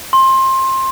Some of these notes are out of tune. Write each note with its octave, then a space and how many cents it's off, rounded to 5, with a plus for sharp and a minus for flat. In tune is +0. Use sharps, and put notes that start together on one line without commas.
C6 +20